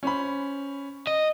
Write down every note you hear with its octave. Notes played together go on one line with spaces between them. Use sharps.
C#4 C5 B5
D#5